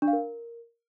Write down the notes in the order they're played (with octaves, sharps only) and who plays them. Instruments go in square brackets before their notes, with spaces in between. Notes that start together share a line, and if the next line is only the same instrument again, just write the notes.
[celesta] D4
F5
A#4